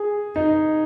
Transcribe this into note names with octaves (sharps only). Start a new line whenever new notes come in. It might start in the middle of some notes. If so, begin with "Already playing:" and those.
Already playing: G#4
D#4